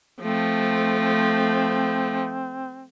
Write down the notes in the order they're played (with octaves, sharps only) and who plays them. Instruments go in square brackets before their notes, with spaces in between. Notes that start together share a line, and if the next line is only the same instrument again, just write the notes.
[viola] F3 A3 [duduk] C4